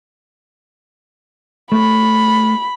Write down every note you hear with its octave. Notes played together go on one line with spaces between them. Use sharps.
A3 B5